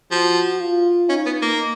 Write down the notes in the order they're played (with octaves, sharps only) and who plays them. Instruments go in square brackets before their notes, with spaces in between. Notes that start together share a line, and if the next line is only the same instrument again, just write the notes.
[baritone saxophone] F3 [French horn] F#4
[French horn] F4
[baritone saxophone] C#4 [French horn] D#4
[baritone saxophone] B3
A#3